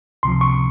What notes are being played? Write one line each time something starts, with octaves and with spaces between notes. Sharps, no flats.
C#2 C3 F3 C6
C#6